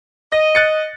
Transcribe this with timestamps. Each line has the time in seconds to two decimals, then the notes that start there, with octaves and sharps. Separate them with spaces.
0.32 D#5 A#6
0.55 F#6 A6 C#7